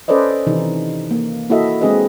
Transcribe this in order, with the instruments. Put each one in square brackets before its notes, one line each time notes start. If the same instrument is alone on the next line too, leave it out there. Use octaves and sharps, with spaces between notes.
[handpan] C#4 A4 B4 C5 D5 D#5
C3 D#3 E3 D#4
A#3
A#3 E4 F#4 A4 D#5 E5
G#3 C4 D4 G#4 B4 D#5